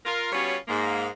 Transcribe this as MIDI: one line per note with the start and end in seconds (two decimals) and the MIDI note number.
0.06 0.32 65
0.06 0.32 70
0.32 0.56 55
0.32 0.56 59
0.32 0.56 61
0.32 0.56 65
0.32 0.56 66
0.32 0.56 73
0.68 1.07 44
0.68 1.07 58